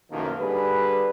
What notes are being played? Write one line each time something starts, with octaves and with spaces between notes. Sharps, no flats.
B1 F#2 A2 D#3 F3 A#3
D3 G3 G#4 B4